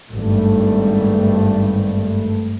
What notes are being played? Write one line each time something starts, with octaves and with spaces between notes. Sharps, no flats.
G#1 G2 A3